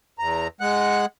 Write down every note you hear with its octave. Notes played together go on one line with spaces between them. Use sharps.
E2 A#5
G#3 F#5 F#6